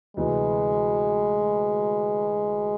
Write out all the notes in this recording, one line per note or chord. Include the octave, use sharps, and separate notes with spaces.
D2 C3 E3 G#3